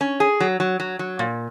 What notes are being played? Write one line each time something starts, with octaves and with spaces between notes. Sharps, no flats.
C#4
G#4
F#3
F#3
F#3
F#3
A#2